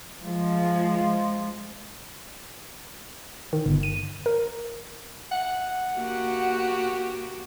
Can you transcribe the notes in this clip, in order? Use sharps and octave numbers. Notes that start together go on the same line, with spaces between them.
F3 G#3
D#3
G1
D#7
A#4
F#5
A#3 F#4 G4